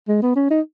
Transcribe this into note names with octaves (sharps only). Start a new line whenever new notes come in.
G#3
B3
C#4
D#4